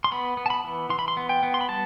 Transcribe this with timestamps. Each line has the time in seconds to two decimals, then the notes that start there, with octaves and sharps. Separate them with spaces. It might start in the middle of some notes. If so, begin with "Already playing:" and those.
0.04 C6
0.12 B3 B5
0.37 B3
0.46 A5
0.50 B5
0.64 E3
0.89 E3 C6
0.99 B5
1.08 C6
1.17 B3
1.29 G5
1.43 B3
1.54 C6
1.61 B5
1.69 G3 A5